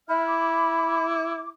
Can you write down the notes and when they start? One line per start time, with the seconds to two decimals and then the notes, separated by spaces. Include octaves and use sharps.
0.09 E4 E5 B5 F6
0.26 D6